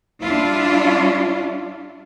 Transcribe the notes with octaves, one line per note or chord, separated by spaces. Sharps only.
G3 D4 E4 F4